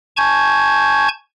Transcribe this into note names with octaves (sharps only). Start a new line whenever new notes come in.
G#5 A5 C#6 G6 G#6